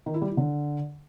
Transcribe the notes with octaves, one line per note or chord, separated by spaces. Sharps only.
D#3
E4
G3
E4
D3